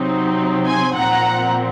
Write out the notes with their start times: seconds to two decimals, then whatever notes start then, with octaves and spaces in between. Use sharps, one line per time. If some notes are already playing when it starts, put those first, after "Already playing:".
Already playing: C3 F#3 C4 D#4
0.66 G#5 C6
0.95 A#2 F3 C4 F#5 A#5